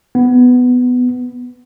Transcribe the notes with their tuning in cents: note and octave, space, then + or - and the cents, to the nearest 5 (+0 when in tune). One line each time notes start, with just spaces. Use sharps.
B3 +10